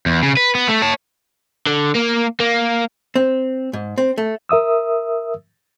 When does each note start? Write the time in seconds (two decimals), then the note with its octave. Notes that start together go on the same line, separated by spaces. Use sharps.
0.06 E2
0.23 C#3
0.37 B4
0.55 B3
0.69 A3
0.82 C#5 A5
1.67 D3
1.95 A#3
2.40 A#3
3.16 C4
3.73 G#2
3.98 C4
4.18 A3
4.49 A#4 E5 D#6 E6